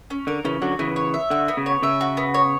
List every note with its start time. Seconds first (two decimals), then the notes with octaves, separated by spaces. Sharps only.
0.10 C#4
0.27 D3 A#4
0.45 C#3 E3 C#4
0.62 D3 F#3 F#4
0.79 C#3 E3 B3
0.96 C#5
1.14 E5
1.30 D3 F#4
1.48 B3
1.57 C#3
1.66 C#5
1.82 C#3 E5
2.01 F#4
2.17 B3
2.34 C#5